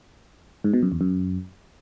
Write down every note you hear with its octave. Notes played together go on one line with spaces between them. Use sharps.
G#2
B2
F#2
E2
F#2